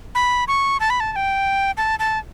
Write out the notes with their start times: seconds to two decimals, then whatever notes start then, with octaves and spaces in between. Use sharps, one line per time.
0.15 B5
0.48 C#6
0.80 A5
0.90 B5
1.00 A5
1.13 A5
1.16 G5
1.77 A5
1.99 A5